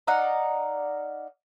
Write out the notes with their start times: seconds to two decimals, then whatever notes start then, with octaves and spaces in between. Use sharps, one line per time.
0.07 D#4 D5 F5 F#5